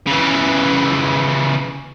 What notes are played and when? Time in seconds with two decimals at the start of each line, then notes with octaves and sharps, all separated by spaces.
0.07 C#3 E3